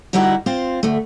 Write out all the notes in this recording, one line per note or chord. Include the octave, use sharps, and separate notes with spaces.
D3 G3 D#4 E4 F#4
C4 F4 C5
D2 A3